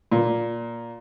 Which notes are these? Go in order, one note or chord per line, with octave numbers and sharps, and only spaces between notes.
A#2